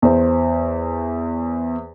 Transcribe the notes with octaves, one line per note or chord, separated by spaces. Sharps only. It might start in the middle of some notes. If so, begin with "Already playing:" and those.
E2 C5